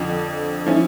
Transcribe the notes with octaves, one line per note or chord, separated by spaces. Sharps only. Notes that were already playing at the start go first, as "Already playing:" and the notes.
Already playing: F2 D3 F3
F3 C#4 E4